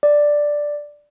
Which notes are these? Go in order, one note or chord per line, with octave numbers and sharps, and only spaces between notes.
D5